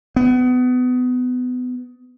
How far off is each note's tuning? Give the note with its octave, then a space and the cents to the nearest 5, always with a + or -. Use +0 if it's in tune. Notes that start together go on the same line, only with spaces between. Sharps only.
B3 +25